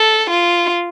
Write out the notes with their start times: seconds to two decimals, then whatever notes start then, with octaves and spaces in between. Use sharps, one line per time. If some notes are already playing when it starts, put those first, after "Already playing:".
Already playing: A4
0.31 F4